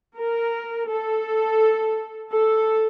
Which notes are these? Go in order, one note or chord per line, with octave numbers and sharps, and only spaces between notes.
A#4
A4
A4